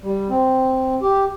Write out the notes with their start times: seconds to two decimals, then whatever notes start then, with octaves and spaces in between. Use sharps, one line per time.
0.03 G3
0.29 C4
1.02 G4